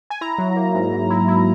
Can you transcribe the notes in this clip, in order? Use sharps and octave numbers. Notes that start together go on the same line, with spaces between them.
G#5
E4 A#5
F#3
A#3
G#2
G#2
E4
E4